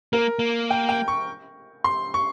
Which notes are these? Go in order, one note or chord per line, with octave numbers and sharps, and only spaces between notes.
A#3 A#4
A#3
G5
G5
C#6
C6
C#6